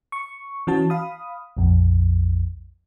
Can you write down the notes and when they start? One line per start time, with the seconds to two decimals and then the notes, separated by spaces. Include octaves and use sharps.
0.12 C#6
0.67 E3 C#4 F#4 A5
0.90 F5 B5 D#6
1.57 A#1 F2